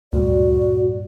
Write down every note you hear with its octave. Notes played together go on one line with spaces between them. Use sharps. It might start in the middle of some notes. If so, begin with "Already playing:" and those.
D2 G2 A#2 G3 F#4 D5